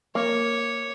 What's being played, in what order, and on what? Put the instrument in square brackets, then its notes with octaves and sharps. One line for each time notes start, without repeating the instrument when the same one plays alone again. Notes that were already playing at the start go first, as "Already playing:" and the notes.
[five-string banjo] A#3 [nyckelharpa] C#5